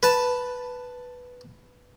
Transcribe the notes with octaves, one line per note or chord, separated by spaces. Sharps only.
B4 A5